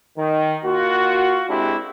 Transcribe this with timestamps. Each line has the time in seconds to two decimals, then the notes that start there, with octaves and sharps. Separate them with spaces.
0.18 D#3
0.64 A#3 F4 F#4
1.50 G#3 C4 D4 E4 G4